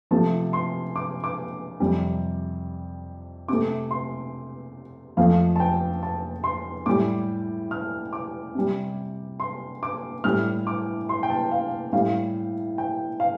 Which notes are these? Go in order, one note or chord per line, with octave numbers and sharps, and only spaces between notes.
C3 F3 A3 A5
C6
D6
D6
F2 C3 G3
C3 A3 D6
C6
F2 F3 A3 F5
A5
G5
A5
C6
A2 G3 D6
F6
D6
C3 G3
C6
D6
A2 G3 F6
D6
C6
G5
A5
F5
A2 G3 F5
G5
F5